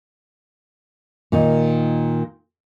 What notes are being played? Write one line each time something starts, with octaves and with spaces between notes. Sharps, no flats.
A#2 D#3 D#4